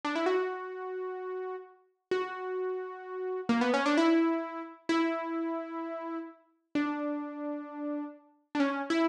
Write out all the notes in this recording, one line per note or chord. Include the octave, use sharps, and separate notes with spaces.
D4
E4
F#4
F#4
A#3
B3
C#4
D4
E4
E4
D4
D4
C#4
E4